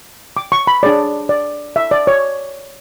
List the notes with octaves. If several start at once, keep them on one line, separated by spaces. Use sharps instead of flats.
D6
C#6
B5
D4 G#4 C#5 D5
D5
E5
D5
C#5